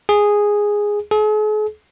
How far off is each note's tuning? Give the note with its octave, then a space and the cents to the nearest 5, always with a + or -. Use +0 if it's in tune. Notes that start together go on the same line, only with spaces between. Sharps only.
G#4 -5
G#4 +45